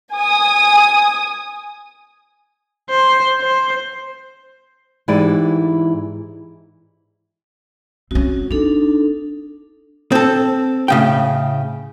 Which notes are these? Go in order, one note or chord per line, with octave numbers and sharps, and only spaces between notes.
G#5 D#6
C5
C5
G#2 E3 E4 G4 G#4 D5
C4 C#4 F#4
C4 D4 D#4 A4
C4 A4
A2 C#3 G5